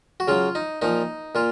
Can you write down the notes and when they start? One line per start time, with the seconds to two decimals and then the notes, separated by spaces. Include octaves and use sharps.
0.20 F#4
0.28 C#3 F#3 F4
0.55 D#4
0.82 A#2 F3 D#4
1.35 A#2 F4